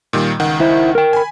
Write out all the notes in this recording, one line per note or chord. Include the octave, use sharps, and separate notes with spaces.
A#2 D#3 G3
C#2 D#3 F#5
E4 C5
A#4 G5
G#5 B5